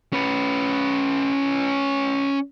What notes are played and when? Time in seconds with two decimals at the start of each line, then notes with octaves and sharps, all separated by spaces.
0.13 C#4 B4